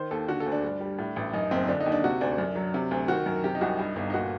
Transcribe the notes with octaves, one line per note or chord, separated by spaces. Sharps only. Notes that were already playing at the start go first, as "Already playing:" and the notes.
Already playing: D#3 C5
D#2 A4
D3 F#4
A4
D2
D4
G2
G3
A2
A1
F#2 D#4
F#1 C4
D3 D4
D#4
D#2
D4
C3 F#4
D2 D4
F#2
F#3
C3
D2
D#3 F#4
F#2 A#4
C3 G4
D#4
C2 F#4
G2 D#4
G1 D#4
D#4
A#2 F#4